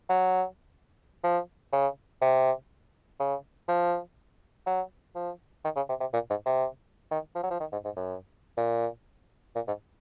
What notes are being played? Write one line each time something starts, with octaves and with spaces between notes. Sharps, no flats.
F#3
F3
C#3
C3
C#3
F3
F#3
F3
D#3
C#3
C3
C3
A#2
G#2
C3
D#3
F3
F#3
F3
D#3
G#2
G#2
F#2
A#2
A#2
G#2